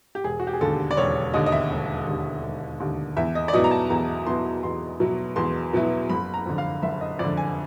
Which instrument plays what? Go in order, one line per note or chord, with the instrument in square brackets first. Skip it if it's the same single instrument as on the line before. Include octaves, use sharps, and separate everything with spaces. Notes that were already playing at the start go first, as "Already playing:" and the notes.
[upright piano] G4
E1 G#4
F#4
G4
G#4
D#2 D3 A4
D5
E1 C#5
D#2 D3 D#5
D#5
E5
E1
D#2 D3
E1
D#2 D3
E2 E5
D#5
D5
B2 F#3 B3 E4 D#5
A#5
A5
E2 A#5
B2 F#3 B3 E4 C6
E2 C6
B2 F#3 B3 E4
E2 C6
B2 F#3 B3 E4
F#1 B5
A#5
F2 D3
F5
F#1 E5
D#5
F2 D3 D5
G#5